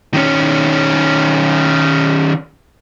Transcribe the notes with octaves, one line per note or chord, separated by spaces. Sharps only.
D#3 C#4